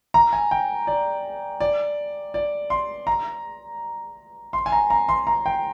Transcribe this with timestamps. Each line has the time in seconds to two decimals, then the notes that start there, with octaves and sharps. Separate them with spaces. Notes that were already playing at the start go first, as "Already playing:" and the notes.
0.14 A#5
0.33 G#5
0.51 G5
0.87 D5
1.60 D5
2.34 D5
2.70 C6
3.07 A#5
4.53 C6
4.66 G#5
4.72 A#5
4.90 A#5
5.09 C6
5.27 A#5
5.46 G5